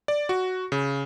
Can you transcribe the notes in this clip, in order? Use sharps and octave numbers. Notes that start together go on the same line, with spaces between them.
D5
F#4
C#3